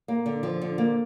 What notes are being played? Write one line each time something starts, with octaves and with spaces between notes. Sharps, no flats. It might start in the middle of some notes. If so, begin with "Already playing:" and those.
A#3
D3
F3
D3
A#3